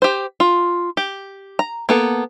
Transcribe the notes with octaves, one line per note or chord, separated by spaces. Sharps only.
G4 C5
F4
G4
A#5
A#3 B3 A4